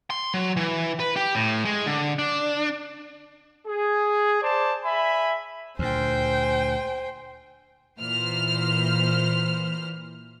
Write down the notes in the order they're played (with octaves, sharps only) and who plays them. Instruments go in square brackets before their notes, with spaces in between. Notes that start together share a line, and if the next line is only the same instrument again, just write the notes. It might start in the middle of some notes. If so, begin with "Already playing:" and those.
[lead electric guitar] C6
F#3
E3
B4
G4
A2
G#3
D3
D4
[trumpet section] G#4
C5 D5 A5
E5 G#5 B5
[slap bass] D2 A#2 [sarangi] C5 [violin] G5 G#5
[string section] A#2 E3 C5 F6